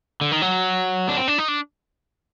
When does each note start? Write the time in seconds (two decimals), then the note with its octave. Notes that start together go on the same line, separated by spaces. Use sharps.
0.21 D3
0.32 D#3
0.42 F#3
1.09 D4
1.17 C4
1.28 D4
1.38 D#4
1.48 D4